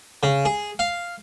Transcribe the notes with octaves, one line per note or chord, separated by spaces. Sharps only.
C#3
G#4
F5